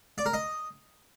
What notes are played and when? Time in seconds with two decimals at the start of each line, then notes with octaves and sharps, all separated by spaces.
0.18 D5
0.26 A#4
0.34 D#5